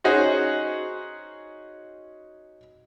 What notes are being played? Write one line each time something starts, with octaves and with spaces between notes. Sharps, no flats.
C#4 D#4 F#4 G#4 C5